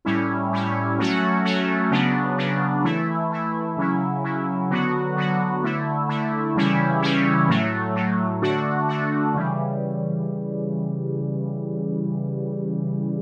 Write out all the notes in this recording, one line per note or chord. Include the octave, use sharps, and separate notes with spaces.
A2 G3 C#4 E4
A2 G3 C#4 E4
F#3 A3 C#4 F#4
F#3 A3 C#4 F#4
C#3 F#3 B3 D4
C#3 F#3 B3 D4
E3 A3 E4
E3 A3 E4
C#3 F#3 C#4 E4
C#3 F#3 C#4 E4
D3 F#3 B3 F#4
D3 F#3 B3 F#4
D3 A3 E4
D3 A3 E4
C#3 E3 G3 C#4 E4
C#3 E3 G3 C#4 E4
A2 F#3 A3
A2 F#3 A3
D3 A3 D4 F#4
D3 A3 D4 F#4
C#3 E3 G3